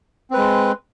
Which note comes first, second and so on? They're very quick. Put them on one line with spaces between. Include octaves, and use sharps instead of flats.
C4 B4 G#3